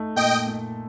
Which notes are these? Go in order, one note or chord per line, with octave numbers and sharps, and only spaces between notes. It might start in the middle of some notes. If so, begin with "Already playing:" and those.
Already playing: A3 D#4
A#2 D#5 G5
A#2